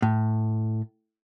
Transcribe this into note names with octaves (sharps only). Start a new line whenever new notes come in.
A2